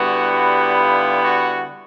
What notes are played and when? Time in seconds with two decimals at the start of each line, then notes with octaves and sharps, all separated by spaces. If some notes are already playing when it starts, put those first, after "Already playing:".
Already playing: D3 G3 B3 E4 F#4
0.33 F#4
0.78 F4
1.23 F#4